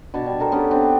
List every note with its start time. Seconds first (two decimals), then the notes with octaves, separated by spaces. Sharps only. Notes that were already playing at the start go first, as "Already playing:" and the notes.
0.14 B2 D4 C#5 A5
0.26 G3
0.39 B3 A4 A#4 C5
0.52 B3 C#4 D4 G4
0.71 B3 C4 D4
0.84 G5